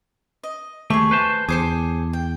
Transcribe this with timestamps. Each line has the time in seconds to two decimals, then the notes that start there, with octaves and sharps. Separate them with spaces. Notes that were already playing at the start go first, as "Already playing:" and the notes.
0.43 D#5
0.90 D#2 A3 G4 G#4 C#6
1.11 B4 C5 A5
1.49 E2 G#4 A4 C5 D6
2.13 G5